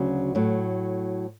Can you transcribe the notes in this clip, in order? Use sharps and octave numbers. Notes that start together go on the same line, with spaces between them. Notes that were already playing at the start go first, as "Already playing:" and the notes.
Already playing: D2 C#3 F#3
A2 F#3